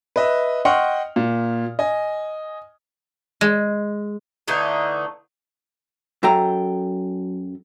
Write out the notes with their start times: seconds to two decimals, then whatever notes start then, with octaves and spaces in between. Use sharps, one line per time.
0.16 B4 D#5 E5
0.65 D#5 F#5 G5 C6 C#6 F6
1.16 A#2
1.79 D#5 G#5
3.41 G#3
4.48 D3 E3 A3 D#4
6.23 F#2 F#3 A4 G5 A#5